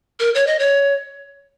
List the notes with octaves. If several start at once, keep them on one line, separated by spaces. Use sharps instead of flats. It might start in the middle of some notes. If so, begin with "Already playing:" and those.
A#4
C#5
D#5
C#5